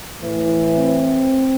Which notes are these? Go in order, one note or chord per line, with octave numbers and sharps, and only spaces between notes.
A2 E3
C4